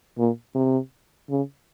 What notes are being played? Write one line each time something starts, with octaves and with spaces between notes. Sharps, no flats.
A#2
C3
C#3